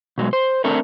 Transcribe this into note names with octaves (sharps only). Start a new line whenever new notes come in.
B2 F#3 G#3
C5
A3 C4 D4 A4 A#4